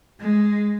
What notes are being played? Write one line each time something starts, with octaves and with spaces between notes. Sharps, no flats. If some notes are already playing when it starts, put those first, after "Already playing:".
G#3